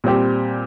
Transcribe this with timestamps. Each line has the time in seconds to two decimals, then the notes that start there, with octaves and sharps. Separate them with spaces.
0.04 A#2 G3 C4 G4